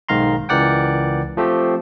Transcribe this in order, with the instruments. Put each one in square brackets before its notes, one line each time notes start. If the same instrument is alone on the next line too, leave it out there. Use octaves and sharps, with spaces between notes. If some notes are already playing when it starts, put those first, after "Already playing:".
[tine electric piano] B1 G#2 D#3 F5 A#5 C6
C#2 E3 A#4 D5 F#5 G5
F3 A3 C4 G4